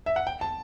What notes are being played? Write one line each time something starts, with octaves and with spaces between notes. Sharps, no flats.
E5
F#5
G5
A5